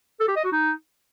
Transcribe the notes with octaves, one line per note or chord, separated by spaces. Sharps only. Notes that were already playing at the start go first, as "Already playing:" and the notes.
A4
G4
D#5
F#4
D#4